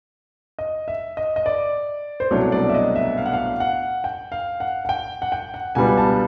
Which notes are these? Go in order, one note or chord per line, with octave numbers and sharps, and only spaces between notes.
D#5
E5
D#5
D#5
D5
C5
C2 B2 F#3 A3 D4 C#5
D5
E5
D#5
E5
F5
F#5
F5
F#5
G5
F5
F#5
F#5
G5
F#5
G5
F#5
C#2 B2 G3 B3 D4 G#5
A5